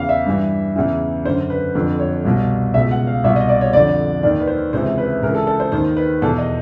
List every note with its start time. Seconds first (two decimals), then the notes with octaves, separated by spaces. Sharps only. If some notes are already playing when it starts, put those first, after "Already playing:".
Already playing: E2 C#3 E3 F5
0.09 E5
0.26 G2 E3
0.76 E2 C#3 E3
1.25 D3 C5
1.28 F#2
1.50 B4
1.75 F2 D3
2.00 C#5
2.25 C2 B2
2.74 C#2 B2 E5
2.91 F#5
3.07 F5
3.24 C2 B2 E5
3.36 D#5
3.49 D5
3.61 C#5
3.73 F2 D3 D5
4.23 D#2 D#3 D5
4.40 B4
4.47 C5
4.73 C#2 C3 E3 C5
4.98 B4
5.23 C#2 C#3 E3 A#4
5.35 A4
5.47 A4
5.60 C5
5.72 D#2 D#3 C5
5.97 B4
6.22 E2 A4
6.25 B2
6.38 D#5